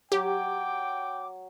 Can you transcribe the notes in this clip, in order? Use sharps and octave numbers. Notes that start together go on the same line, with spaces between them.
F#3 G4 G5 D6